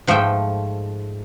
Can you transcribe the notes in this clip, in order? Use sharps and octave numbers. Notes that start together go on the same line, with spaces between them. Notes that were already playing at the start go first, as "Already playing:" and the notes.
G#2 F3 A3 E5 G5